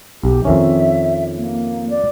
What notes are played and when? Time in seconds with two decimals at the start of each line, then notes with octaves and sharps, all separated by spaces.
0.23 B1 G4
0.45 F2 D#3 C#4 E5
1.37 A#3
1.90 D5